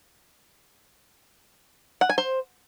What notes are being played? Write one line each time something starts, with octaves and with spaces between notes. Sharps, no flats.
F#5
G#5
C5